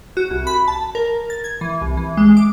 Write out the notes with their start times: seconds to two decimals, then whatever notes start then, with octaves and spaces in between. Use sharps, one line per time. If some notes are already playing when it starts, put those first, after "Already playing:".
0.17 F#4
0.31 C2
0.47 B5
0.68 A5
0.95 A#4
1.30 A6
1.44 G#6
1.61 E3
1.81 C2
1.97 E3
2.17 G#3
2.37 D6